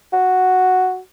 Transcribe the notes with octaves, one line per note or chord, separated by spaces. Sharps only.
F#4